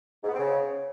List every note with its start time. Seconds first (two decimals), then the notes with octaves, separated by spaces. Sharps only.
0.23 G#2
0.29 B3
0.34 C4
0.39 C#3